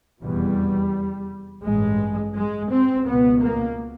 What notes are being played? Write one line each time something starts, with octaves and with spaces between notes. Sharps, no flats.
F1 E2 B2 G3
A1 G2 G#3
G#3
C4
C#2 B2 B3
A#3